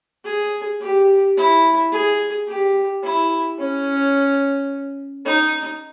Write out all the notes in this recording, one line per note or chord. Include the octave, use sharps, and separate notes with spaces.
G#4
G4
E4
G#4
G4
E4
C#4
D#4